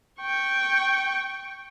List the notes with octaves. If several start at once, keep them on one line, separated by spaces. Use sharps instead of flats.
G5 C#6